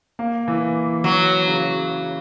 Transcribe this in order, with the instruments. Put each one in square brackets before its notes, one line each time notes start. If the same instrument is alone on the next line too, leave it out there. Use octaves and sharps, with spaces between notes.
[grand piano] A#3
E3
[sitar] F#3
[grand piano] C#3